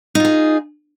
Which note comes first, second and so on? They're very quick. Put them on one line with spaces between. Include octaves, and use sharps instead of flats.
D#4 F4 G#4